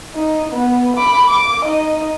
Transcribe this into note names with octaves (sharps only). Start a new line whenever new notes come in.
D#4
B3
B5 D6
D6
D#4 D#5